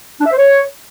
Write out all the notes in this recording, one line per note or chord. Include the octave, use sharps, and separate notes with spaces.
D4
E5
C5
C#5